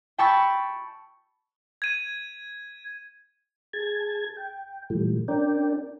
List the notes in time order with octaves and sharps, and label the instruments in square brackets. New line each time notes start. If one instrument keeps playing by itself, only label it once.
[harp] G5 A5 B5 C#6 E6 A6
[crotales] G#6 D#7
[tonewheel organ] G#4 A5 G#6
G5
A#2 E3 F3 G3 A3
C#4 D4 A#4 D5 G5